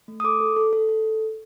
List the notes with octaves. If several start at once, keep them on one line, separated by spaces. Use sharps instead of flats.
A3
D#6
A4 D6
A4
A4
A4
A4